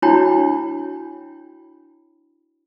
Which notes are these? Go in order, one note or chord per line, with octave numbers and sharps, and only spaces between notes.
D4 E4 F#4 C#5 G5 B5